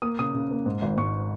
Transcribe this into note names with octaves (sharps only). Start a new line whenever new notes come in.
A#3 D#6
C#3 D#6
C#3
A#3
G#2
G#1
G#2 C#6